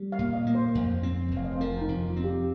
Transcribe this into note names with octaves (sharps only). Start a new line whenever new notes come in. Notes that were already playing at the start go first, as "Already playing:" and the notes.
Already playing: G3
F5
A#2
D#5
A#3
C5
F2
C4
F1
F5
D#5
C5
F3 A#4
D#4
F2
F4
C4
G4